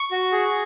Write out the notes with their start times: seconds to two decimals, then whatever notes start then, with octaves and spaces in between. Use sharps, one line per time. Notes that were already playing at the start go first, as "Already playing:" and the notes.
Already playing: C#6
0.11 F#4
0.32 G#4